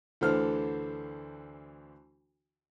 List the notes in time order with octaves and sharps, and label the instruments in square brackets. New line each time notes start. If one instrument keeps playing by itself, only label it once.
[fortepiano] D2 D3 E3 A4 C5 F6